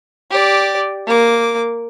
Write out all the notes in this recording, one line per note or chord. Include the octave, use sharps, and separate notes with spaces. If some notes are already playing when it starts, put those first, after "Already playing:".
G4 D5
A#3 D6